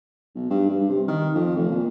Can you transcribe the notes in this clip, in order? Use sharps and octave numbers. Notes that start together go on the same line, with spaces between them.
B1
G2
G2
C3
D#3
F2
F1
A#2